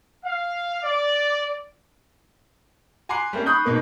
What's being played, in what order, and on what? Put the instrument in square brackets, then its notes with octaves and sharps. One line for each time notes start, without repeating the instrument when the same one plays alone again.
[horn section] F5
D5
[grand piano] G#5 A#5 C6 D6 F#6 C7
G3 A3 A#3 C#4
B5 C#6 D#6 F#6 G6
G#2 B2 A#3